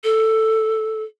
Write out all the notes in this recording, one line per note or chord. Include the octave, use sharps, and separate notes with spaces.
A4